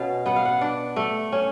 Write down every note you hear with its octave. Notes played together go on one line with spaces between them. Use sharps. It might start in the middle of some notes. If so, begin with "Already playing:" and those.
Already playing: B2 C#4 F5
B3 F#5
F5
F#5
D4
A3
C#4